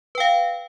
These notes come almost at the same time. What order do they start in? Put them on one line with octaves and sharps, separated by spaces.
B4 G5 F5